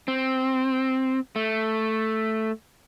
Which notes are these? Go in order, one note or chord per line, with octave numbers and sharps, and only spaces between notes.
C4
A3